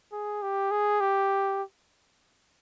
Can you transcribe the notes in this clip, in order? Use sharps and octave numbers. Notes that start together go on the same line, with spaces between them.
G#4
G4
G#4
G4